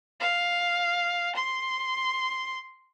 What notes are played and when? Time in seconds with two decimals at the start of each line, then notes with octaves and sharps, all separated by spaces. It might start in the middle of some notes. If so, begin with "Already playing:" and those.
0.20 F5
1.36 C6